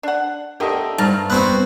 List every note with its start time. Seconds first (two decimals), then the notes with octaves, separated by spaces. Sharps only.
0.03 D4 F#5
0.60 D3 A3 G4 A#4 D#5
0.98 G2 A5 A#5 F6
1.30 B3 C4 F#4 F#6